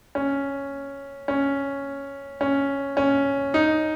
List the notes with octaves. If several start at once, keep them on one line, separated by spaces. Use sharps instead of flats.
C#4
C#4
C#4
C#4
D#4